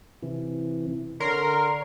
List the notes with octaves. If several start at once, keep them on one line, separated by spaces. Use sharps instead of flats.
C3 E3
D3 A#4 C#5 C6